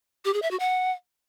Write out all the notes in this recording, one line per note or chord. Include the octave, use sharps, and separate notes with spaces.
G4
G#4
E5
F#4
F#5